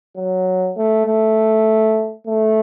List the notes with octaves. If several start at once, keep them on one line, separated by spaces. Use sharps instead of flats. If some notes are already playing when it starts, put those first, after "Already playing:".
F#3
A3
A3
A3